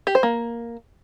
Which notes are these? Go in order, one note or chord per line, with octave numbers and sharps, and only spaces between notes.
G4
C5
A#3